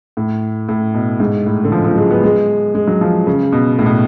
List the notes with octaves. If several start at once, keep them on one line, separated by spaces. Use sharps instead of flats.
A2
A2
B2
G#2
A2
D3
F3
F3
F#3
G#3
B3
G#3
G#3
F#3
F3
C#3
B2
A2
B2